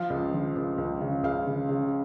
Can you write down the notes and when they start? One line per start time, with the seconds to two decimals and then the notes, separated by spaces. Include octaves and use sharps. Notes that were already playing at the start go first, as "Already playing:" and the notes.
Already playing: F3 F5
0.10 C#2
0.34 F3
0.56 C#2
0.78 C#2
1.01 C#3
1.23 C#2 F5
1.47 C#3
1.69 C#3